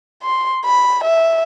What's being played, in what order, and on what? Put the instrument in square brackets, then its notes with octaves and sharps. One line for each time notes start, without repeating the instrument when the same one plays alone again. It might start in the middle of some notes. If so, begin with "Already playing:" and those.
[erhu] C6
B5
E5